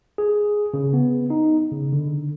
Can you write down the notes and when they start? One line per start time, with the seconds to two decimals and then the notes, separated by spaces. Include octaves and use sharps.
0.18 G#4
0.74 C#3
0.93 B3
1.30 D#4
1.71 C#3
1.93 D3